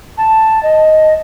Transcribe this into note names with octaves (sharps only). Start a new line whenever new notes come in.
A5
D#5